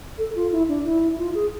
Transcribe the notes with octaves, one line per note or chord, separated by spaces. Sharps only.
A4
F4
E4
D4
E4
F4
G#4